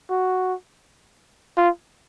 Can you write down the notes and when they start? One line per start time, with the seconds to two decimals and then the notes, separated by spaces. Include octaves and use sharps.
0.10 F#4
1.57 F4